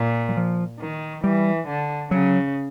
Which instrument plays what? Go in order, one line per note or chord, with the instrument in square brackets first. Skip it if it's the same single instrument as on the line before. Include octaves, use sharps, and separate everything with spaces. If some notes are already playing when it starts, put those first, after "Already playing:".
Already playing: [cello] A#2
[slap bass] F#3
F3
[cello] D#3
[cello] E3 [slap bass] G3
[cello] D3
[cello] C#3 [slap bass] F#3